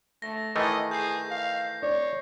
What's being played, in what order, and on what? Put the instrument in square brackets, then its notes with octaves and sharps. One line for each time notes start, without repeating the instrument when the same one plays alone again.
[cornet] A3 [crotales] A#6
[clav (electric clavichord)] D#3 E3 A3 [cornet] D#5 [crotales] C7
[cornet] G#4 [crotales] G6 C7
[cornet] F5
[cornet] C#5 [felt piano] D5